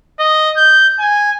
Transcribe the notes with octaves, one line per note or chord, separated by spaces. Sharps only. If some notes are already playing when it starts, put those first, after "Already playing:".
D#5
G6
G#5